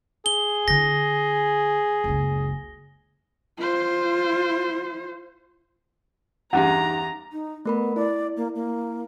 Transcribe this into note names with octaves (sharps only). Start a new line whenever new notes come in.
G#4 G7
D3 E4 A#6
F#1 C#2
F4 C5
E2 G2 C#4 D#4 G4 F#5 A#5
D#4
A3 B3 A#4 B5
E4 D5
A#3
A#3